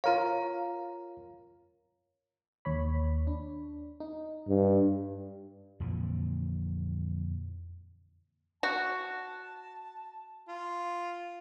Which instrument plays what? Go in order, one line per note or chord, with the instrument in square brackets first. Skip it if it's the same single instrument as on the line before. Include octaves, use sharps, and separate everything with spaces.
[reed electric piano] F4 A#4 C#5 [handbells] F5 A#5
[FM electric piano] D#2 C#5 B5
D4
D#4
[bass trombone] G2
[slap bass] F2 A#2 D3 E3
[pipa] F#4 [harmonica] A5
[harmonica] F4